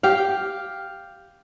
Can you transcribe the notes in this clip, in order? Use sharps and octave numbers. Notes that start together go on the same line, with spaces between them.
G4 F5